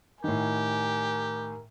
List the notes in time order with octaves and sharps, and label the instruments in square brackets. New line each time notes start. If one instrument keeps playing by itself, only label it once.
[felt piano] A2 D#3 [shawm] G4 [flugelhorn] A#4 [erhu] G#5